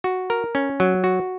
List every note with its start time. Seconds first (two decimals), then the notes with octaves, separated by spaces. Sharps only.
0.04 F#4
0.30 A#4
0.55 C#4
0.80 F#3
1.04 F#4